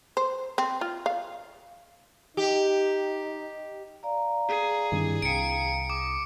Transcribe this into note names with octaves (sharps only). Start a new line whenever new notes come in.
C5
C4
F4
F5
D#4 G4
D5 F5 A#5
G#4
G2 D#3 C4 D4 E4
C2 F5 G5 A#5 C#7 D7
D6 D#6